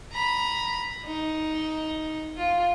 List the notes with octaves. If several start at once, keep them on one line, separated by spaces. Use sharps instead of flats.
A#5 B5
D#4
F4